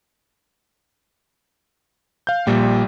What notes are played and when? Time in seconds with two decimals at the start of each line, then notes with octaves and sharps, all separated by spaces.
2.27 F5 G6
2.47 A#1 A#2 G3 G5